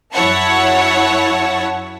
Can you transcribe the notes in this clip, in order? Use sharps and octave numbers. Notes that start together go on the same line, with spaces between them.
F#2 E4 C#5 F#5 A5 C#6